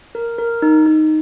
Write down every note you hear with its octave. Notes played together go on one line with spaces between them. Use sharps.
A#4
A#4
D#4
D#4